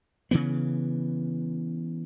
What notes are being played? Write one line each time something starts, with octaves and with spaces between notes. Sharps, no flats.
C#3 E3 B3